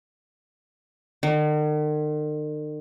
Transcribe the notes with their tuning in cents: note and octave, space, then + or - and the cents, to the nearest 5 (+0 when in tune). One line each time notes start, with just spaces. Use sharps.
D#3 -45